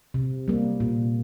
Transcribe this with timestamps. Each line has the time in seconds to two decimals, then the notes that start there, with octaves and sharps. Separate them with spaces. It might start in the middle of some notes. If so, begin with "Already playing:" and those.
0.14 C3
0.48 G3 A#3
0.80 A#2